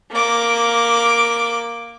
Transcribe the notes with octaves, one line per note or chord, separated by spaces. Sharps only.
A#3 D6